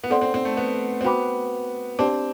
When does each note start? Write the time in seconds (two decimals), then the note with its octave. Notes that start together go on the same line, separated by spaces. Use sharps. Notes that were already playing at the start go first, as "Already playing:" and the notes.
0.04 B3
0.10 C4 A4 D5 F#5 C6
0.21 C4
0.34 C4
0.45 A3
0.57 B3
1.01 C4
1.04 B3 F#4 C5 G5 B5 D6
1.99 C4 D4 G4 D5 A5 D6